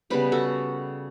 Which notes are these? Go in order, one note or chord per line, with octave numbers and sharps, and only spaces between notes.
C#3 G3 B3 G4 B4
F#4 A4